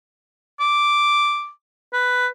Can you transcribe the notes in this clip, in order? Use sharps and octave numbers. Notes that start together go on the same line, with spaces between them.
D6
B4